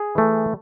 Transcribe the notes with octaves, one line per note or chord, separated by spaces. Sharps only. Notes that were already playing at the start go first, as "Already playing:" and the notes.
Already playing: G#4
E3 A3